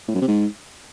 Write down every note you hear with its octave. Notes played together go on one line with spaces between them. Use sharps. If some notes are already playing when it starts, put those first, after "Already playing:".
A2
F#2
C3
G#2